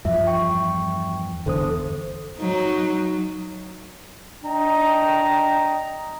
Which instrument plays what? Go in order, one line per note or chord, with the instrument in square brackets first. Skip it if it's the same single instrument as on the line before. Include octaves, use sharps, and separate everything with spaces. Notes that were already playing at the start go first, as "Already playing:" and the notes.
[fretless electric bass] E2 G2 F3 [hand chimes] F4 E5
[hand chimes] G5 C#6
[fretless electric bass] G1 E2 D3 [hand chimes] A4 C5 D#6
[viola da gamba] F#3 D#4
[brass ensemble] D4 D#5 G5 A#5